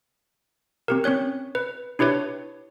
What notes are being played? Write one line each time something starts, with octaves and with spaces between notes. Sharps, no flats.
C4 G4 A#4
C4 C#4 C#5 F#6
B4
D4 E4 G4 B4 C#5